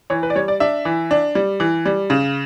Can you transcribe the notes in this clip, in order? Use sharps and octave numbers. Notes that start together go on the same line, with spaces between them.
E3 C#5
B4
D5
G3 C#5
D5
D4 E5
E3
D4
G3
E3
G3
C#3